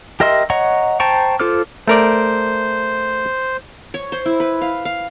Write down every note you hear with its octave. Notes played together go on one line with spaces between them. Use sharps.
G4 A#4 D#5 E5 C6
C#5 D#5 F#5 A#5 C#6
C5 G5 A5 A#5 C#6
F4 A4 C5 D6 F6
A3 A#4 C5 D5
C#5
C5
E4
B4
F5
F5